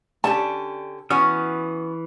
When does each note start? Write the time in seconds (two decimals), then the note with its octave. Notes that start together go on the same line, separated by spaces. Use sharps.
0.24 D3 C#4 G4 A5
1.10 E3 B3 C#4 F#4 D#6 F6